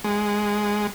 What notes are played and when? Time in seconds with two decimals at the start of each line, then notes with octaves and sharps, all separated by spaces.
0.04 G#3